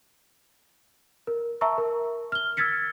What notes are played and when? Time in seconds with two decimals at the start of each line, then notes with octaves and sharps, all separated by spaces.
1.27 A#4
1.61 E5 A5 A#5 C#6 E6
1.78 A#4
2.32 F6 G7
2.57 E6 F6 G#6 A6 B6 C#7